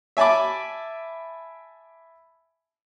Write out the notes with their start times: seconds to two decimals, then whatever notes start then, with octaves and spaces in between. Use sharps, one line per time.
0.17 E5 G#5 A5 B5 D6